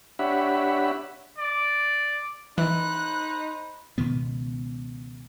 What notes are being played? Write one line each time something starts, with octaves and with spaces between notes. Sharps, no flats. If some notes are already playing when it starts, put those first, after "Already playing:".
D4 G4 C#5 E5 F#5 B5
D5
E3 D#4 C5 B5 F#6
C#2 B2 D#3 B3